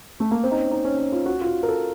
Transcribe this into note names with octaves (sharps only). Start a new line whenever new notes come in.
A3
A#3
C4
D#4
C#4
D#4
C#4
C#4
F4
F#4
F4
F#4
A#4
A4